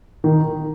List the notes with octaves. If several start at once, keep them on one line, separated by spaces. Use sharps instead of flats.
D#3